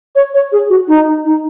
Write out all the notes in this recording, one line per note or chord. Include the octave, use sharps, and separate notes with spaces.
C#5
C#5
G#4
F#4
D#4
D#4